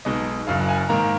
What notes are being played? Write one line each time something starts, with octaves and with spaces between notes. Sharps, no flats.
B1 B2 G#3 D#4 D#5
F#1 F#2 C#3 F5
G#5
G#2 D#3 A#3 A#5